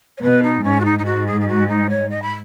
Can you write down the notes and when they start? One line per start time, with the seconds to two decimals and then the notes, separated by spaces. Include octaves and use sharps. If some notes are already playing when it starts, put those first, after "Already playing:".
0.17 C#5
0.22 B2 B4
0.43 D#4
0.64 G#2 C#4
0.80 F#4
0.85 D#4
0.99 D#4
1.05 G#2 F#4
1.27 G#4
1.41 G#4
1.48 F#4
1.68 D#4
1.90 C#5
2.10 D#5
2.22 B5